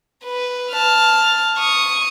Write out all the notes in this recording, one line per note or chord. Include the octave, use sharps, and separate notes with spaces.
B4
A5 F6
C#6 D#6